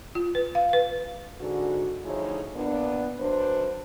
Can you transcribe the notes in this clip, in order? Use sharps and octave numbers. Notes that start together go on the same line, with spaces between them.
F4
B4
F5
B4
G#2 D3 F#4
D2 F3 D#4 E4 G#4 C#5
A#2 B3 D4
F#2 D4 B4 C5